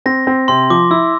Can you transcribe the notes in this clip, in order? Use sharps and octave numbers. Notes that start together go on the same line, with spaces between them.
C4 A#6
C4
C3 C6
F3 D6
E4 E6